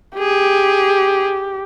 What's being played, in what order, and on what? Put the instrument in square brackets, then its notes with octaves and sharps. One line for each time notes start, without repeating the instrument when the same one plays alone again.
[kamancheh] G4 [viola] G#4